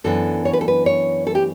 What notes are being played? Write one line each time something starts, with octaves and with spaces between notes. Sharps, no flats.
F#2 E3 B3 D4 A4
C#5
B4
A4
B4
C#5
A4
G4